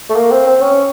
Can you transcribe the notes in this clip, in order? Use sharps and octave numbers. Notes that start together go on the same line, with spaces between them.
A3
A#3
C4
C4
C#4